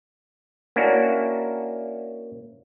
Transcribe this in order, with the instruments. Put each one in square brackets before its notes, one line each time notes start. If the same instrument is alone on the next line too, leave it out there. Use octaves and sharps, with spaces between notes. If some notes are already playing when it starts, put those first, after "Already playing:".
[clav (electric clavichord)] A#3 C#4 D4 E4 F#4